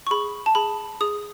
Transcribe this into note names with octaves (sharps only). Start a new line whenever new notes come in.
C#6
G#4 B5
A5
G#4 B5
G#4 D#6